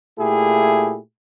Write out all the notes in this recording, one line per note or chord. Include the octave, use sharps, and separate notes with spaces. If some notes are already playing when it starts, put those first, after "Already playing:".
A#2 A3 E4 G4 G#4